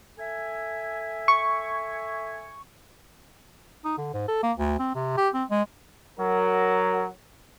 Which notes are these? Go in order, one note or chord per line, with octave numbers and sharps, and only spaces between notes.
A4 E5 G#5
C#6
D#4
D3
G#2
A4
A#3
D2
C4
C3
G4
C4
G#3
F#3 A#4